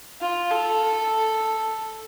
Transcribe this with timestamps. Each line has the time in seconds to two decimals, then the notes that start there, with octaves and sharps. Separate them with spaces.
0.21 F4
0.51 A4